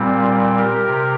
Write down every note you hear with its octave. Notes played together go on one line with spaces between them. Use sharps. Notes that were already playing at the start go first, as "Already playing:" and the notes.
Already playing: A#2 G3 C4
G4 A#4
C3